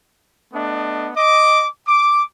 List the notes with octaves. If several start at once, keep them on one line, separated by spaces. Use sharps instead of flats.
A3 B3 D4 D#5
D#5 D6
D6